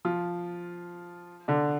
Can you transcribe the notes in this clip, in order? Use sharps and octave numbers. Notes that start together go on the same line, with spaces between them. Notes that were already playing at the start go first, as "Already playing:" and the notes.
F3 F4
D3 D4